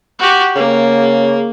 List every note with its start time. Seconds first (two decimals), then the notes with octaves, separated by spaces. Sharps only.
0.19 F#4 G4
0.56 C#3 A#3